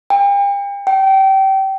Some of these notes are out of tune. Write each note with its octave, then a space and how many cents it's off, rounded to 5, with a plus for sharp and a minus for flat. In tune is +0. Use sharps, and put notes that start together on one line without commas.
G5 +40
G5 -25